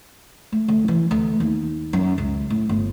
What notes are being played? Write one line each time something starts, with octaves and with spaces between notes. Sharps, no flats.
A3
D2
E3
D2
D#2
F#2
C#2
A2
G1